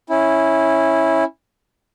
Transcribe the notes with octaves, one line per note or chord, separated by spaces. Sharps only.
C#4 E4